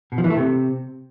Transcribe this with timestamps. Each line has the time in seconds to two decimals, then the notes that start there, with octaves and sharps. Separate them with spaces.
0.12 B2
0.18 F3
0.24 E3
0.30 A3
0.36 C3